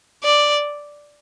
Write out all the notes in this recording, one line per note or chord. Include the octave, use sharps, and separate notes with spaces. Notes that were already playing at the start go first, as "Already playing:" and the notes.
D5